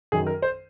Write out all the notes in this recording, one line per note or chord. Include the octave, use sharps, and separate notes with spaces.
F#2 D#3 F#3 G#4
A#4
C5